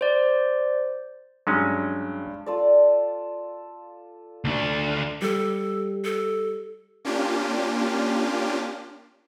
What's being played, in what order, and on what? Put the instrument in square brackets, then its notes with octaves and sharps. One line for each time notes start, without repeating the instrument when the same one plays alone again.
[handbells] C5 D5
[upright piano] G2 [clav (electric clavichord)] F#3 G#3 C#4
[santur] F4 A4 D5
[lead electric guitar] D2 D4
[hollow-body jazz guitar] G3 [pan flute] A4
[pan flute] A4
[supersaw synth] A#3 C#4 D4 F4 G4